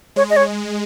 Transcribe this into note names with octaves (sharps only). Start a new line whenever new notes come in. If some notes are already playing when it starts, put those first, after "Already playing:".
G#3 C#5
D#5
C#5